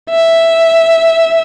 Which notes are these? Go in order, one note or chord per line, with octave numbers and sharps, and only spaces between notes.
E5